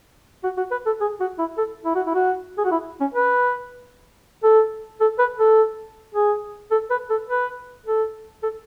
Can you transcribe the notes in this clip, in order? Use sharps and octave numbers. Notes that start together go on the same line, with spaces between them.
F#4
F#4
B4
A4
G#4
F#4
E4
A4
E4
F#4
E4
F#4
G#4
F#4
E4
C#4
B4
A4
A4
B4
A4
G#4
A4
B4
A4
B4
A4
A4